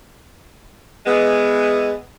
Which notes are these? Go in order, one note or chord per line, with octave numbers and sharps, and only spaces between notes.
E3 G#3 B3